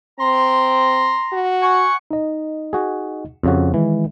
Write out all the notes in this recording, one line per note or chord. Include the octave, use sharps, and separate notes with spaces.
C4 A#5 C6
F#4
F#5 G#5 C#6
D#4 D#5
F#4 G#4
F2 C#3 F#4
D#3 E3 G#3